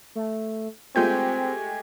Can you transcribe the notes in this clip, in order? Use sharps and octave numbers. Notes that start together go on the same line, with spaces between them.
A3
G#3 A3 C4 F4 G4 G#5 G6